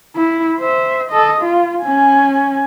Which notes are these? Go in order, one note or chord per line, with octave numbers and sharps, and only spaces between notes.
E4
C5 E5
A4 D#5
F4
C#4 G#5